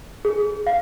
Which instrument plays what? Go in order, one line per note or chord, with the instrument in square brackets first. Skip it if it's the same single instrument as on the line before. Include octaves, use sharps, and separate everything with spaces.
[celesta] G#4
F5